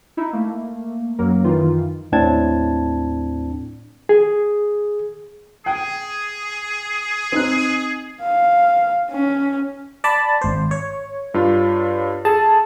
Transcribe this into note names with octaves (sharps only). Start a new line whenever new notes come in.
D#4 E4
A3 A#3
F#2 F#3 A#3 A#4
F#2 D#3 E3 D#4 F4
D#2 A2 C4 D4 A5 G#6
G#4
G#4 G5
C4 D#4 F#6
F5
C#4
D5 A5 B5
G#1 C5
C#5
G2 F4
G#4 A4 A5